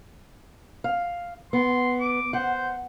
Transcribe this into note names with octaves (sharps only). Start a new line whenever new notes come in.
F5
B3 C6
D6
C5 F#5